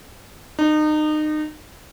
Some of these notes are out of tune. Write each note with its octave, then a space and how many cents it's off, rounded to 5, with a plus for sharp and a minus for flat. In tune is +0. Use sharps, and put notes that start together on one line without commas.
D#4 -30